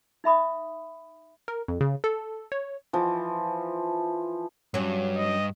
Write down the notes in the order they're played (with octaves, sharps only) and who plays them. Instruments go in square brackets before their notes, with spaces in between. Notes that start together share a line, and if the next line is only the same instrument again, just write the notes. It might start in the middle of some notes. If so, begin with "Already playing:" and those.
[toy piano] D#4 E5 B5 D#6
[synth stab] A#4
F2
C#3
A4
C#5
[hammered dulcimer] E3 F3
[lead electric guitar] G2 [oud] F#3 C#4
[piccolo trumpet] D#5